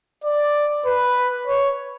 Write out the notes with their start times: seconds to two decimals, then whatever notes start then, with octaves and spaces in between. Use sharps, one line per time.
0.24 D5
0.86 B4
1.47 C#5